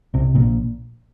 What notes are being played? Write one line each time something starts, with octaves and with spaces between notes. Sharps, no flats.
C2 C3
A#1 A#2